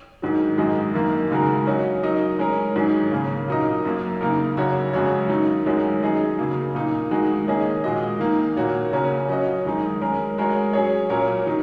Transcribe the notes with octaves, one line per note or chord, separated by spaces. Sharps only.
G#2 D#3 F#3
F#2 D#3 G#3 F#4 D#5
F#2 D#3 A#3
C#3 G#3 D#4 F#4 A#4
F#3 C#4 F#4 D#5
F#3 D#4 A#4 D#5
G#3 C#4 A#4
G#2 D#3 F#3 C#4 G#4
C#3 A#3 C#4
A#2 F#3 D#4 A#4 D#5
F#2 F#3 A#3
C#3 A#3 D#4 A#4
F#2 C#3 A#3 F#4 C#5
F#2 C#3 G#3 F#4 C#5
D#3 F#3 D#4
F#2 D#3 G#3 C#4 F#4
F#3 D#4 G#4 D#5
C#3 F#3 A#3
A#2 A#3 D#4
D#3 G#3 D#4 F#4
D#3 A#3 C#4 G#4 D#5
A#2 G#3 F#4 D#5
D#3 A#3 D#4
A#2 A#3 F#4 C#5
C#3 A#3 C#4 F#4 A#4
F#3 C#4 F#4 D#5
F#2 D#3 G#3 D#4
G#3 C#4 A#4
G#3 F#4 A#4 C#5
F#3 C#4 G#4 C#5
A#2 F#3 C#4 A#4 C#5
D#3 F#3 D#4